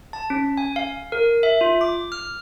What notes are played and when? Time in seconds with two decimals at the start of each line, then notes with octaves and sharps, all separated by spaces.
0.13 A5
0.30 C#4
0.57 G#5
0.76 F5
1.12 A#4
1.43 E5
1.61 F4
1.81 D6
2.12 F6